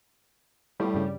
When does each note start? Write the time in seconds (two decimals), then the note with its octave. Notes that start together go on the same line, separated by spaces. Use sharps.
0.80 A2 G3 B3 F4
0.94 G2 C#3